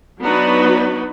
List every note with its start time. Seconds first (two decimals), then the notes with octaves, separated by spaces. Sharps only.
0.22 F#3 B3 D4 D#4 F#4 B4